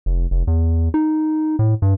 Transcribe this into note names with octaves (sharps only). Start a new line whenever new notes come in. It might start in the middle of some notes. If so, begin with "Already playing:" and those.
F1
F1
E2
D#4
A2
G2